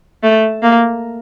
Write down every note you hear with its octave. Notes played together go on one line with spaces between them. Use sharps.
A3
A#3